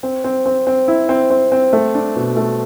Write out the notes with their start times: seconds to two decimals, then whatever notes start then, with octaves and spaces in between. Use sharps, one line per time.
0.03 C4
0.24 C4
0.46 C4
0.67 C4
0.88 E4
1.09 C4
1.30 C4
1.52 C4
1.73 A3
1.94 D4
2.15 B2
2.37 A3